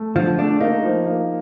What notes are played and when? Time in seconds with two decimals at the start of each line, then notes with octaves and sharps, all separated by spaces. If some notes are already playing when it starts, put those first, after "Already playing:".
Already playing: A3
0.15 D3 F3
0.38 A3 D4
0.61 A#3 D#4
0.84 F3
1.06 A#3